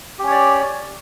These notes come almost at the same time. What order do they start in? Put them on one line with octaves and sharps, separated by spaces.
G4 C#4 C#5 D5